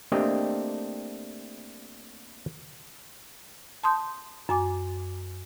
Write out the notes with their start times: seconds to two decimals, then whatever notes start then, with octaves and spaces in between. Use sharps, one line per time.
0.12 A3 A#3 C4 D4 G4 D#5
3.83 A5 C6 D#6 G6
4.49 F#2 G#5 D6